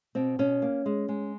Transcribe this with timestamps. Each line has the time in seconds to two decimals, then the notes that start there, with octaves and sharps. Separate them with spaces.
0.15 B2 C4
0.39 B2 C#4
0.62 A#3
0.86 G#3
1.09 G#3